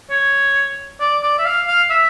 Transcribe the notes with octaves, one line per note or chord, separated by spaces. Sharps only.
C#5
D5
D5
E5
F5
F5
E5